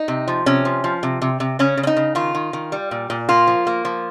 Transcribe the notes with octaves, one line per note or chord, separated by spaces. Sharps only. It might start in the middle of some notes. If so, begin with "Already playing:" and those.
Already playing: D#4
C3
F3
C3 C#4
F3
F3
C3
C3
C3
C#3 C#4
C#3
C#4
D#4
C#3
D#3 F4
D#3
D#3
G3
A#2
A#2
A#3 F4
F3
A#3
F3